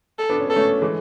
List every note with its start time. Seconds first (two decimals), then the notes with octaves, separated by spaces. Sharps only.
0.19 A4
0.30 B3 D4
0.40 C#4
0.48 B3 A4
0.56 A3 C#4
0.81 E3 G#3